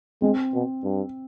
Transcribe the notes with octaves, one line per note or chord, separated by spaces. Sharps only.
G#3 C4
B2
G2